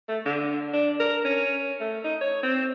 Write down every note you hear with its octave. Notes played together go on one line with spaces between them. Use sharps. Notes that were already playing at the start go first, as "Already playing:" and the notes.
A3
D3
D4
A#4
C#4
A3
D#4
C#5
C4